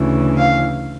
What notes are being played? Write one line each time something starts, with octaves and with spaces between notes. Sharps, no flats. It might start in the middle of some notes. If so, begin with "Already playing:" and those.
Already playing: D2 C#3 E3
F5